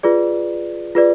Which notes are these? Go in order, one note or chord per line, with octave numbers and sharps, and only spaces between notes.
F4 G#4 B4 D5
F4 G#4 B4 D5